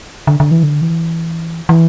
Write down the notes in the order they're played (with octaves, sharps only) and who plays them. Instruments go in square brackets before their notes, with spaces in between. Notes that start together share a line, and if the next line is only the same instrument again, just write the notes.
[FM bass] D3
D3
E3
D3
E3
E3